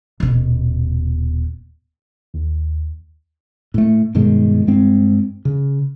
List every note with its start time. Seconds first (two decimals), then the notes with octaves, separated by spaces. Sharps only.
0.20 D#1 B2
2.34 D#2
3.74 A2 A3
4.15 G2 B2 D#3 G#3
4.67 G2 G#3 C4
5.45 C#3